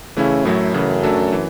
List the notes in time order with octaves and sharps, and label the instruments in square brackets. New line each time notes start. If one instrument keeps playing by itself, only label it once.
[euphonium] C#3 [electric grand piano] E3 A3 C#4 E4
[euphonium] F#2 [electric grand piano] A2 F#3 A3 E4 A4
[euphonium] F#2 [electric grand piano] C#3 E3 A3
[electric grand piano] F#3 A3 D4 A4
E3